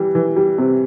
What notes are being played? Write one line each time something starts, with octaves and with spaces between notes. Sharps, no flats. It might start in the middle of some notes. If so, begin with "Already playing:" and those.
Already playing: E3 G3
E3
G3
C3